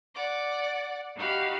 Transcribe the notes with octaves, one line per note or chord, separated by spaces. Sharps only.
D5 F#5 D6
D#4 F#4 G4 F5 B5